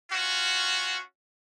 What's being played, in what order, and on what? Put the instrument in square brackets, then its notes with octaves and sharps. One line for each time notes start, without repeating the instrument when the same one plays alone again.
[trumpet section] C#4 F4 F#4